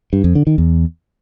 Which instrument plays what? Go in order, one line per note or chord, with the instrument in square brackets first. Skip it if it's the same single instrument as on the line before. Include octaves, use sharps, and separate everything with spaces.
[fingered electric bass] G2
F2
D3
D#3
E2